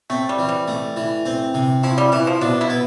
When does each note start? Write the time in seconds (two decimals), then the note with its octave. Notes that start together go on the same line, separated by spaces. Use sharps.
0.10 A3 C4
0.29 G3
0.39 E3
0.49 G3
0.68 A3
0.96 E3
1.26 C4
1.54 C3
1.83 F3 E4
1.98 G3
2.12 E3 E4
2.27 F3
2.41 B2 D4
2.61 E4
2.70 B3